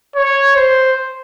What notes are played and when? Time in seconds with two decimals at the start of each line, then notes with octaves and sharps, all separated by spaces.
0.16 C#5
0.56 C5